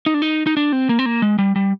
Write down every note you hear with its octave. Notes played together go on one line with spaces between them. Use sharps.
D#4
D4
D#4
D#4
D4
C4
A#3
C4
A#3
G#3
G3
G3